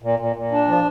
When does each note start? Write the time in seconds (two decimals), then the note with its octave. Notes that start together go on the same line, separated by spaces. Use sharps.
0.02 A#2
0.19 A#2
0.36 A#2
0.52 D4
0.68 F3